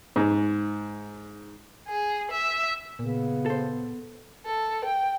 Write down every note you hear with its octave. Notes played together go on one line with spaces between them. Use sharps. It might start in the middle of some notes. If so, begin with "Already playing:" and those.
G#2
G#4
E5
A#2 C#3 B3
A4 C5
A4
G5